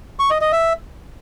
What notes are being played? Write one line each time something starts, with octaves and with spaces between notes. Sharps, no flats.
C#6
D#5
D#5
E5